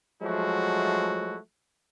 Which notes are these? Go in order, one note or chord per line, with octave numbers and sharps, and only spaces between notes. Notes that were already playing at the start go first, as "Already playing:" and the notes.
F3 F#3 G#3 A3 E4 F#4